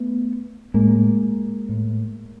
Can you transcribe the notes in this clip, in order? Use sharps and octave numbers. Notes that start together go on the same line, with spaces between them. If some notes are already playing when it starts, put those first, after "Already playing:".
Already playing: A3 B3
A2 G#3 A#3
A2